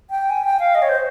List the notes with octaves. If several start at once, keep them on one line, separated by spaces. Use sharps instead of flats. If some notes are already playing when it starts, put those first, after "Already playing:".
G5
G#5
G5
F5
D#5
C#5
C5